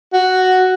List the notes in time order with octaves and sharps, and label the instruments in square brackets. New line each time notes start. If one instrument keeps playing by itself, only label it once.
[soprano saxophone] F#4